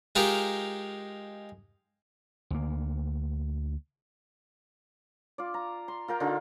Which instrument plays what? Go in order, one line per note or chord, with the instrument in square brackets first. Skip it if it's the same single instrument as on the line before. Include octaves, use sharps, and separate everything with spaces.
[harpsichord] G#3 D#4 F4 G4 A#4
[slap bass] D2 A#3
[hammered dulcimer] F4 D5
A#5
C6
F4 A#4 G5
D3 D#4 F4